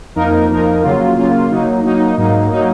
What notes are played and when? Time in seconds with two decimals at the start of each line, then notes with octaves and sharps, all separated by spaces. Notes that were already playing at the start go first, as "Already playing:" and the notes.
0.16 F2 F3 A#3 D#4 A#4
0.50 F2 F3 A#3 D#4 A#4
0.83 C#3 F#3 A#3 F4
1.17 C#3 F#3 A#3 F4
1.51 F#3 A#3 D#4
1.84 F#3 A#3 D#4
2.17 G#2 F#3 A#3 D#4
2.51 F#3 A#3 D#4